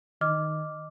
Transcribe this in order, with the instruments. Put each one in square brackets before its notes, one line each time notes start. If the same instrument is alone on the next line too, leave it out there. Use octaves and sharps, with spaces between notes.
[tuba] D#3 [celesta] D#5 D6 F6